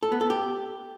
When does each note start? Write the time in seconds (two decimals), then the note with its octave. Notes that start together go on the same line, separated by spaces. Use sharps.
0.03 A4
0.12 B3
0.21 A4
0.30 G4